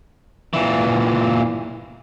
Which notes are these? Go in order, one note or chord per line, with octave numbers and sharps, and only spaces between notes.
A#2 E3